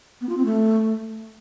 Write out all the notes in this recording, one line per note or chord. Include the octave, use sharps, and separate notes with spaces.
B3
F4
C4
A3